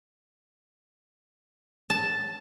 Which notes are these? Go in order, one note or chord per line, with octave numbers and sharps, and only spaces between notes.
A5